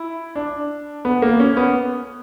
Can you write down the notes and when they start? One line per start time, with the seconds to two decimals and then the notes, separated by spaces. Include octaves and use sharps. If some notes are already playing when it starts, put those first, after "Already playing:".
Already playing: E4
0.36 D4
1.05 B3
1.22 A#3
1.40 C#4
1.57 B3